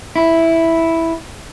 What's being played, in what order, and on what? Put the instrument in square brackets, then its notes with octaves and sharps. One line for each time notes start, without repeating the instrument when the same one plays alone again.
[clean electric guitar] E4